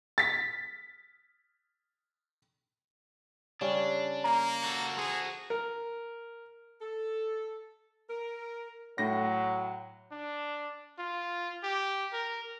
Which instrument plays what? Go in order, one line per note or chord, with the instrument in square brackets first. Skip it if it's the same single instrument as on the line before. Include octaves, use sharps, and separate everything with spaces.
[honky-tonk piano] A6 B6
[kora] C#3 G3 C#4 [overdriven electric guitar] D4
[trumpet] A#3 [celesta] A#5
[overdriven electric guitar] F#4 A4
[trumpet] G#4 [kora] C5
[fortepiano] A#4
[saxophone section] A4
A#4
[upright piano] A2 A#6 [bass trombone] F#3
[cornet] D4
F4
G4
A#4